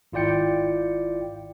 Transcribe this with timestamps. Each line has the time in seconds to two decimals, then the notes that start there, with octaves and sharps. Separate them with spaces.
0.12 G#1 E4 F4 D5 G5 C#7